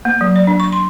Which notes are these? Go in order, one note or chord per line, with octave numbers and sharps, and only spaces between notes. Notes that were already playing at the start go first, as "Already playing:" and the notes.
A#3
F#3
D5
D4
C#6
C6